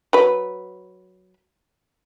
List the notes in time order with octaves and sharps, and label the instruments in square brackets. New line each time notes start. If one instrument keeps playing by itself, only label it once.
[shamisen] F#3 B4